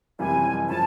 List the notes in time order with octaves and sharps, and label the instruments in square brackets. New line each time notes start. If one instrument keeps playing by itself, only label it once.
[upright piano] F#1 F2 C3 E3 G3 [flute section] G#5
[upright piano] C#3 F3 [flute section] A5